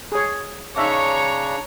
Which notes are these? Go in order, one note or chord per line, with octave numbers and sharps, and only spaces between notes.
G#4 C#5
C#3 D4 D#4 C#5 E5 F5 A#5 C#6